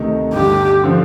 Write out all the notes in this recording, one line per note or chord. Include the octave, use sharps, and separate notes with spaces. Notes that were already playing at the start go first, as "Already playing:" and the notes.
Already playing: D2 C3 D#3 A3 D#4
G1 G2 D3 G4
D3 F3